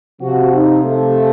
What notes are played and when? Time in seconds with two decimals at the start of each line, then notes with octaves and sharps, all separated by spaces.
0.20 C3 F3 F#4
0.52 D#4
0.83 A3